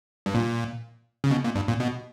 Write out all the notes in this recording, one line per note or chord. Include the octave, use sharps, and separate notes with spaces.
G2
A#2
C#3
B2
A#2
G2
A#2
B2